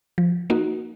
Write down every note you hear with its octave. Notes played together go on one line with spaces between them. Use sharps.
F3
A#3 D#4 F#4